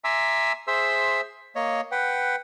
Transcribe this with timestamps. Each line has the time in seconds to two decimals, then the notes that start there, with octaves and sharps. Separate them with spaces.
0.04 E5 G#5 A#5 C6 D6 E6
0.68 G#4 C5 E5 C6 E6
1.56 A#3 C#5 D#5
1.92 B4 F#5 G5